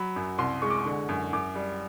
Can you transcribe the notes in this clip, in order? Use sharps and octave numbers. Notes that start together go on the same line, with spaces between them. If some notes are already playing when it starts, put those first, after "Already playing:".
Already playing: F#3 B5
F#2
C2 C6
G#3 C#6
D6
C#6
D3
F#2
F#2 D6
G3